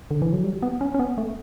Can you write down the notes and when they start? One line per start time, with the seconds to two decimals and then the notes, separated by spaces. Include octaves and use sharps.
0.11 D3
0.22 E3
0.33 F#3
0.44 G3
0.63 B3
0.81 C#4
0.94 C#4
0.99 B3
1.18 A3